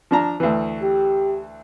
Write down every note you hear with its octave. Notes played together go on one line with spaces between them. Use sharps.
F3 D4 A#5
D2 E3
G4